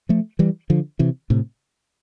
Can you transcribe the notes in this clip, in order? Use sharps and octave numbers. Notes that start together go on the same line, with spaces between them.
F3 A3
E3 G3
D3 F3
C3 E3
A2 C3